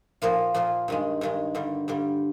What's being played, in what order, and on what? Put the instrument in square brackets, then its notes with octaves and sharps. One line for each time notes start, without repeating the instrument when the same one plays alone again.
[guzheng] A#2 F3 A#3 F4
A#2 F3 A#3 F4
G2 D#3 G#3
G2 D#3 G#3
G2 D3 G3
G2 D3 G3